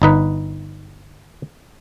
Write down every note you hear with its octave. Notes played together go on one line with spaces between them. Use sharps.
G1 D#4 B4